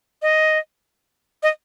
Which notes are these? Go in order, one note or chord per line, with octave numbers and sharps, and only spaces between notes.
D#5
D#5